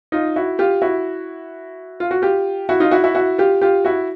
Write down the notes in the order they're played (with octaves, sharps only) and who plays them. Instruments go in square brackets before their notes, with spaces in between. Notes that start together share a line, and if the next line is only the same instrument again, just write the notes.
[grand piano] D#4 F4
E4 F#4
F4 G4
E4 F#4
F4
F#4
F4 G4
E4 F#4
D#4 F4
E4 F#4
E4 F#4
E4 F#4
F4 G4
F4 G4
E4 F#4